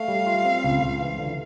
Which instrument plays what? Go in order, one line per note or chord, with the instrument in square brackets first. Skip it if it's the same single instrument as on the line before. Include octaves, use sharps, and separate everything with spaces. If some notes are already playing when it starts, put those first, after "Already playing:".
Already playing: [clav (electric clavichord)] A3 [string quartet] F5
[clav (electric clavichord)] G3
F4
C4
C#2
C#2
E3
D3